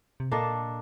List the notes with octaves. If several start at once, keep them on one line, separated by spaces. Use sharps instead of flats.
C3
A#2 A#3 D4 A4 D#5